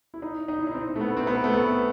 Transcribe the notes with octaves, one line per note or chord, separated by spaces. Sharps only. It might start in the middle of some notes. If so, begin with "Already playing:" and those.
E4
D#4
D#4
E4
D#4
C4
A3
B3
C4
B3
A3
B3